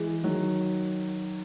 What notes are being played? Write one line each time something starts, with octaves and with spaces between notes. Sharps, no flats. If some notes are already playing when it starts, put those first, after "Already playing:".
Already playing: E3 G#3
D#3 F#3